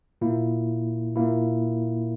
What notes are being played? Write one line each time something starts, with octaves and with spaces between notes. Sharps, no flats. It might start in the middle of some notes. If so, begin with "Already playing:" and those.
A#2 A#3 E4
A#2 A#3 E4